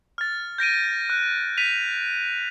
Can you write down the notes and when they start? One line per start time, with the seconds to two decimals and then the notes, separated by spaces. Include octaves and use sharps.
0.18 F6 A6
0.58 G6 A#6 D7 D#7
1.10 F#6
1.57 B6 D#7 F7